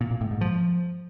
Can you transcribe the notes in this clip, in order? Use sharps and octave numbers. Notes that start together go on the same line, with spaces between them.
A#2
A#2
A2
G#2
F3